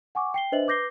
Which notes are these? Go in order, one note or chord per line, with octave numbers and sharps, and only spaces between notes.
F#5 G#5 C#6 D6
G5 C7 G7
D4 B4 C5 D#5 E5 F#7
B4 D6 G6 A#6 C7 G7